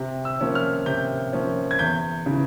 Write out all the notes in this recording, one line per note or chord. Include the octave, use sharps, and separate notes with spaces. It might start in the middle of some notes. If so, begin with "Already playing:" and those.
Already playing: C3
E6
F3 A#3 C#4
F6
C3 G6
F3 A#3 C#4
G#6
E2 G6
C#3 E3